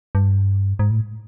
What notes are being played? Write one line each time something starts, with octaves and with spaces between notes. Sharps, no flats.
G2
G#2
A2